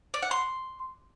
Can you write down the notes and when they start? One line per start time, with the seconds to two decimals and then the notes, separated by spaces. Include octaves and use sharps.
0.14 D5
0.22 F#5
0.31 C6